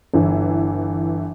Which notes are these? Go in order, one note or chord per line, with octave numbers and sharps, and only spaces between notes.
G1 E3